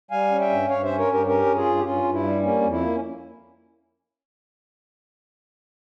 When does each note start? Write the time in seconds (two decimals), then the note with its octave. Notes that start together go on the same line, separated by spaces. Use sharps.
0.11 G3 F5 G#5
0.30 C#4
0.40 E5 G5
0.49 G2
0.69 G2 C#5 F5
0.83 C#4 C5 E5
0.97 A#4 C#5
1.07 G2
1.12 G4 A#4
1.26 C#4 G4 A#4
1.46 G2
1.56 F4 G#4
1.65 G2
1.77 G4
1.84 G2 C#4 F4
2.04 G2
2.13 E4
2.23 G3
2.42 A#3 C#4
2.61 F2
2.71 E4
2.81 A#3
2.93 C#4